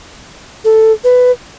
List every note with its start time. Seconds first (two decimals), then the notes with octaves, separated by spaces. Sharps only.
0.65 A4
1.04 B4